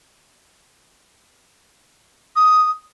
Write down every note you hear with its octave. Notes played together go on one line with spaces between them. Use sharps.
D#6